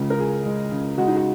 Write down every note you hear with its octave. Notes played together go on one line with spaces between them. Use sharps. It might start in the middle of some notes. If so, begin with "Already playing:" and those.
Already playing: C#2 C#3 G#3
A#4
C#2 G#4
G#3
C#3
G#3 F#4
D#4
F#4